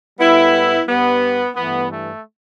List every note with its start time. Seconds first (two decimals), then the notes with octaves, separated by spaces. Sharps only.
0.19 A2 G3 B3 E4
0.88 G2 G3 B3
1.56 G2 E3 A3 B3
1.91 A3